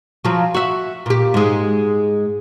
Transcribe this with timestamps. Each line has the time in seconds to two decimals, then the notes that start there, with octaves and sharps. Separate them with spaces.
0.25 F3 F#3
0.54 F#4 E5
1.06 A#2 G4
1.34 G#2 G#3